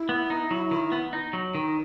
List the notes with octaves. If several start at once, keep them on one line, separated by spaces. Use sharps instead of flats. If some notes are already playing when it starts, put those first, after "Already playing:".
Already playing: E4
B3
D#4
F#3
D#3
B3
D#4
F#3
D#3 D#4